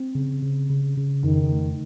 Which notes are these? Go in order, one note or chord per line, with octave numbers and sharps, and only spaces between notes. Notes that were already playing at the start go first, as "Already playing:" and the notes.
Already playing: C4
C#3
C#3
C#3
C#3
F2 D#3
A3